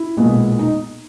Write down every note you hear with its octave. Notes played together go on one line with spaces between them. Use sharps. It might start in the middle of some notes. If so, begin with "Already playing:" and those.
Already playing: E4
B1 A#2 G#3 B3
D#4